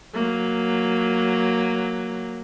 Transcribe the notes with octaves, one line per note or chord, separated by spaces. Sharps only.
F#3 A#3